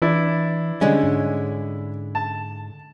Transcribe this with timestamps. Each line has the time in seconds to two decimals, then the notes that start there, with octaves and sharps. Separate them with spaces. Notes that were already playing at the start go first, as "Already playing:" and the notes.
0.02 E3 D4 E4 D5
0.81 D3 G3 G#3 C#4
1.04 G#2
2.15 A5